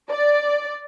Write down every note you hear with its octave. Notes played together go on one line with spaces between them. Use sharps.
D5